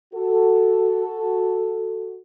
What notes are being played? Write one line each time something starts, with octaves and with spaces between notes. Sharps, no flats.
F#4 A4